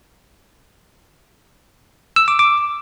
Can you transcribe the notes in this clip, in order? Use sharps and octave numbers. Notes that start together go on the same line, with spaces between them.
E6
D6
D6